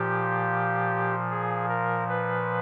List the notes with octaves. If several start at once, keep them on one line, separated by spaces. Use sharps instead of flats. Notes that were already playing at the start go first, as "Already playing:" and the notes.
Already playing: A#2 F3 G4
G#4
A#4
B4